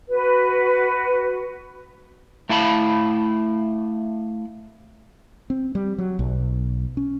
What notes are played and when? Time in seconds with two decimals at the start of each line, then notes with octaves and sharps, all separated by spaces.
0.08 F#4 B4
2.49 A3 E4 F5 A5 B5
5.50 C4
5.75 G3
5.98 F#3
6.19 B1
6.97 C#4